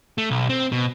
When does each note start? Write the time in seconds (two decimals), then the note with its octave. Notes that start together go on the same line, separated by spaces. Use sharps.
0.18 A3
0.31 B1
0.49 C4
0.72 B2